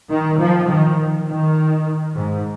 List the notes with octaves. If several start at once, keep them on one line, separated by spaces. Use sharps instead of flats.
D#3
F3
D#3
D#3
G#2